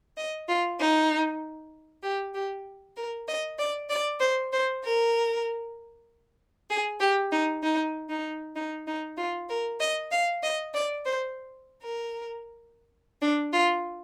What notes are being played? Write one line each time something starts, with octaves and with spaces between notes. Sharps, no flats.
D#5
F4
D#4
G4
G4
A#4
D#5
D5
D5
C5
C5
A#4
G#4
G4
D#4
D#4
D#4
D#4
D#4
F4
A#4
D#5
F5
D#5
D5
C5
A#4
D4
F4